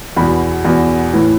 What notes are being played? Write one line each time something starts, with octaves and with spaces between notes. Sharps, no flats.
E2 B2 B5
E2 B2
A2 E3